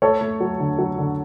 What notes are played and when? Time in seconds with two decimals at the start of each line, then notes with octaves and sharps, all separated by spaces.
0.02 A3 A4 C#5
0.21 A3
0.40 F#3
0.60 D3
0.79 F#3
0.98 D3